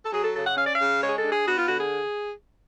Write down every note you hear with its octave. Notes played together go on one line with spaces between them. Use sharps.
A4
F#3 G#4
A4
C#3 A4
F#5
C#4 F5
D5
C#3 F5
G#3 C#5
G#4
A4
D4
G#4
B3 F#4
F4
D3 F#4
G#4